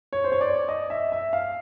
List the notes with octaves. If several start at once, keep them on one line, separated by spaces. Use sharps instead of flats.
C#5
C5
C#5
D5
D#5
E5
E5
F5